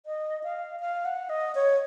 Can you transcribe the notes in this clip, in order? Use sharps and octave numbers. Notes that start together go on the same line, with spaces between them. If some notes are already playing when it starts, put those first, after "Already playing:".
D#5
F5
F5
F#5
D#5
C#5